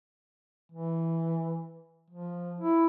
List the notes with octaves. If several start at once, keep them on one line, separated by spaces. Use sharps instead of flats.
E3
F3
E4